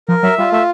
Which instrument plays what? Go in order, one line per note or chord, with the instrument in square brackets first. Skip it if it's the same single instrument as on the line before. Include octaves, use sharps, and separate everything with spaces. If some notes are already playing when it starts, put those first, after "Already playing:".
[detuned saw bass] F3 [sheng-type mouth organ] A#4
[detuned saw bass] F#3 [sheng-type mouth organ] E5
[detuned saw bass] G3 [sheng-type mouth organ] F4
[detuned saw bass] A3 [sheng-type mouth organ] E5